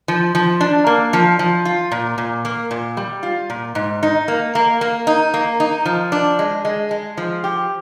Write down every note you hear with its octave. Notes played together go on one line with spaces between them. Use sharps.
F3
F3
D4
A#3
F3
F3
F4
A#2
A#2
A#3
A#2
G3
F4
A#2
G#2
D#4
A#3
A#3
A#3
D#4
A#3
D#4
F3
D4
G#3
G#3
G#3
F3
G4